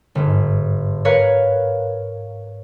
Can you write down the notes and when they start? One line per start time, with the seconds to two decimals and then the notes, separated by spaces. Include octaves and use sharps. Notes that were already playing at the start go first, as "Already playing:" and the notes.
0.15 G1 G#2
1.05 A#4 B4 C#5 F5 F#6